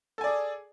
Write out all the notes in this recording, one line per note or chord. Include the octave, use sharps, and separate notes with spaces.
G#4 A4 D5 G#5